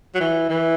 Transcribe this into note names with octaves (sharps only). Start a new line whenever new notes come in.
F#3
E3
E3